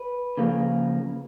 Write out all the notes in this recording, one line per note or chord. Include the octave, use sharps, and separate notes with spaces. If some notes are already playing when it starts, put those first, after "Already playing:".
Already playing: B4
C#3 F3 A#3